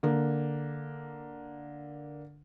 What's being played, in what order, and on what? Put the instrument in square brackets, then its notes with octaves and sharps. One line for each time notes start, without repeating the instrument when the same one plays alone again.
[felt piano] D3 A#3